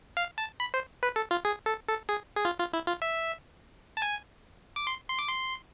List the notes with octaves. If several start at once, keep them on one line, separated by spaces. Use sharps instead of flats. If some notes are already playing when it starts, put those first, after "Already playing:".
F5
A5
B5
C5
B4
A4
F4
G#4
A4
A4
G#4
G#4
F4
F4
E4
F4
E5
A5
G#5
D6
C6
C6
D6
C6